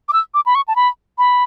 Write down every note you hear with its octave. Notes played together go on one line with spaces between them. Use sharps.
D6
E6
D6
B5
C#6
A5
B5
B5